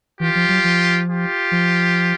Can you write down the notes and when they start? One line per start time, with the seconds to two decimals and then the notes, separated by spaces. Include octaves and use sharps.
0.20 E3 F4 G4
0.35 F3
0.49 F#3
0.64 F3
1.08 F4 G4
1.51 F3